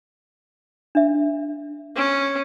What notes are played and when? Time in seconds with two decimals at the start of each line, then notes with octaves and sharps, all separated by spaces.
0.95 D4 E5
1.96 C#4